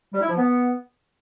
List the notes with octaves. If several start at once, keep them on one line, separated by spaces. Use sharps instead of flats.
G3
E4
F3
B3